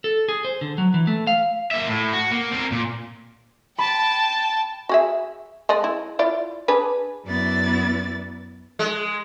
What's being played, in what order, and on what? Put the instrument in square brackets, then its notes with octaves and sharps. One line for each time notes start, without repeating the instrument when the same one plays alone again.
[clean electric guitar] A4
G#4
C5
D3
F#3
E3
A3
F5
[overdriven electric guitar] A#3 E5
A2
F#4
A#3
C4 A#4
A#2
[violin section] G5 A5 [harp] B5
[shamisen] F#4 G#4 E5
G#3 D5 D#5
E4
E4 F4 D5
D4 G#4 B4
[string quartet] F#2 B3 E4 D5 A6
[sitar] G#3